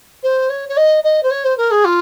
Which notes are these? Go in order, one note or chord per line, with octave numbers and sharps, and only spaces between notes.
C5
C#5
C#5
D#5
D#5
C5
C#5
C5
A#4
G#4
F4